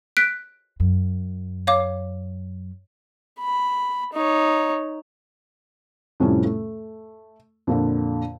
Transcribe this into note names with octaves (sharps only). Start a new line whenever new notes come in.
F#6 B6 D7
F#2
C#5 F5 D6
B5
D#4 C#5
F2 A2 C3 G3 C#4
A3
F2 A#2 D3